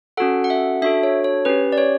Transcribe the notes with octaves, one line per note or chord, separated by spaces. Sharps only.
C#4 F#4 A4 F#5
F#5
E5
D4 F#4 A4 E5
C#5
C#5
C#4 G4 B4
D5
C#5